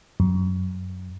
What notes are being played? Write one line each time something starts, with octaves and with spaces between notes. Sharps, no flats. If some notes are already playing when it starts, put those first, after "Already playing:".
F#2